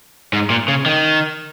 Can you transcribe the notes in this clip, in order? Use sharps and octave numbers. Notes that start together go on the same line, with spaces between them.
G#2
A#2
C#3
D#3